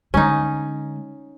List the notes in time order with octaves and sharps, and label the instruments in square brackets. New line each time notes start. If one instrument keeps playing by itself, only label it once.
[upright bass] D3 G#3 [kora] C#4 D#4